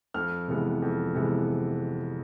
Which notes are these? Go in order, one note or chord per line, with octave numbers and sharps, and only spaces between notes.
F2 F6
C3 E3 G#3 B3
F2
C3 E3 G#3 B3